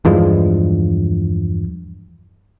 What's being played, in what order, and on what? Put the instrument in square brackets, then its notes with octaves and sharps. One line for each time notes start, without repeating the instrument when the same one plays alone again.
[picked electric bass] E2 G2 F3 G#3